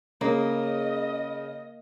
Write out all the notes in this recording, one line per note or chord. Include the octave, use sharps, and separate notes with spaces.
C#3 A#3 D#5